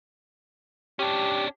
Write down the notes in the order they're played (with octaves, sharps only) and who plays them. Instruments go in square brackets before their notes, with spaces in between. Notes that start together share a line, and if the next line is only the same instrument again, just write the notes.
[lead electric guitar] C#4 D4 [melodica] G4